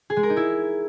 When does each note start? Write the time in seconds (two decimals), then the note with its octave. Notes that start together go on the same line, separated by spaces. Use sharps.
0.10 G#4
0.17 G#3
0.23 A#4
0.30 D#4
0.37 E4